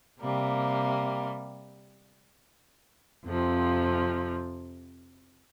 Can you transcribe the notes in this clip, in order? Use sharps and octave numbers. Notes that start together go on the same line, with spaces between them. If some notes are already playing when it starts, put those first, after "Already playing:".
C3 G3 A#3
F2 C3 F3